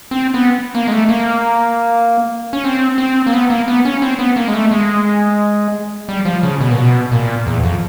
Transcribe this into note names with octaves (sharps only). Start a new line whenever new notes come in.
C4
B3
A#3
G#3
A3
A#3
C#4
C4
C4
A#3
B3
A#3
B3
C#4
C4
B3
A#3
G#3
A3
G#3
G3
F3
C#3
B2
A#2
B2
A#2
E2
F2